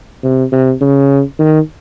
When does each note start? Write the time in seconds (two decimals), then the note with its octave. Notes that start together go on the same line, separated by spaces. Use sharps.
0.23 C3
0.52 C3
0.81 C#3
1.39 D#3